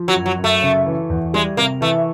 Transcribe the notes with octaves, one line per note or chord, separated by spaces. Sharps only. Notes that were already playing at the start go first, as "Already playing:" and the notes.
Already playing: F3
F#3
F#2
F#3
F#2
A3
C#3
E3
E2
G3 G#3
C3 A#3
E3 A3